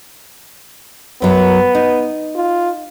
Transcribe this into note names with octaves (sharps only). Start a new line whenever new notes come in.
F#2 F#3 B3
D#4
F4